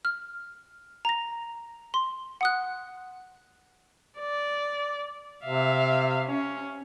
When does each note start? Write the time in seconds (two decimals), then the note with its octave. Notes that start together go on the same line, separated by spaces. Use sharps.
0.05 F6
1.05 A#5 A#6
1.94 C6
2.41 F#5 D#6 F#6
4.19 D5
5.45 C3 E5 F5
6.26 C#4